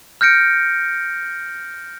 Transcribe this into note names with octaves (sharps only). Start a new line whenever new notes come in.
F6 G6 A#6 C#7 D7